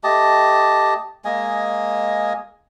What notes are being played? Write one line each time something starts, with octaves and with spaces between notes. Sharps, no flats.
A3 G4 D#5 A5
G#3 A#3 D#5 G#5